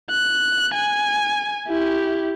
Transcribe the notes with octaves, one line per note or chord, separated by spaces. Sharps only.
F#6
G#5
E4 G4